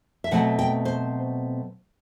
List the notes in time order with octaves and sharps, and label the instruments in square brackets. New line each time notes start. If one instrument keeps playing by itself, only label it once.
[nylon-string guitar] E5
B2 F#3 A3 C4 F#5
G5
C5